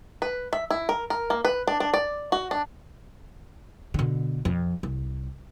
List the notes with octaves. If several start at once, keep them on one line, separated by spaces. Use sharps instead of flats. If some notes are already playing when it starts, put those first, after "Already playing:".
B4
E5
E4
A#4
A#4
A#3
B4
D4
D4
D5
F#4
D4
B2 D3
F2
C2